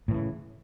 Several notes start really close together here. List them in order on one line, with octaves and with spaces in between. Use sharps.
A2 E3 C#3